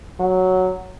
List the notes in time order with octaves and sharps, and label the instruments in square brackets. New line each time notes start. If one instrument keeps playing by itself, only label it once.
[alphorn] F#3